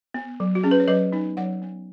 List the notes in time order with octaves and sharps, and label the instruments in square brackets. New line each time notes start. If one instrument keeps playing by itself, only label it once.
[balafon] B3
F#3
F#4
C#4 G#4
B4
C#5
F#3 B4 D#5
B3 D#4
F#3 C#5 F#5
B3